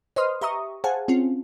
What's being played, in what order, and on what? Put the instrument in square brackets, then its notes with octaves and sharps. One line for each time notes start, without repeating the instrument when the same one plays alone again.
[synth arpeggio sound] B4 C5 D#5 C6 D#6 F6
G4 E5 A#5 C#6 D#6
G#4 C5 F5 F#5 G#5 A5
C4 C#4 F4